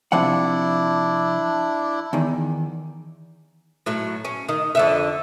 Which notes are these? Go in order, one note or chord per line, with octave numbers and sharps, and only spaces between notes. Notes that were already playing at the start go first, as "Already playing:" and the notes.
C3 F3 D4 E4 F#5
E2 D#3
A2 F#3
C#4
D#3
F2 D3 E5